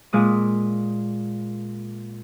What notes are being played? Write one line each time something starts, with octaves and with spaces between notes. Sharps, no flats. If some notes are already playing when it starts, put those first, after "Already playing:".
A#2 G#3 D#6